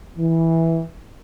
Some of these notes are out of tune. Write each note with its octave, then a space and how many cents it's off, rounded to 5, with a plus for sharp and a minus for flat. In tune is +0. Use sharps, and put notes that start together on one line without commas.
E3 -5